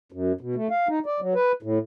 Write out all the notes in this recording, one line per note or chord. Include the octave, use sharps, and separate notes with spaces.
F#2
B2
A3
F5
D#4
D5
F#3
B4
A2